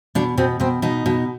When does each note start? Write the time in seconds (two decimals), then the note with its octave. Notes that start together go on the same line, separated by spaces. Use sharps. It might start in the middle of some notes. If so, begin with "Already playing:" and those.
0.15 B2 D4
0.38 B2 C4
0.60 B2 C4
0.82 B2 D#4
1.06 B2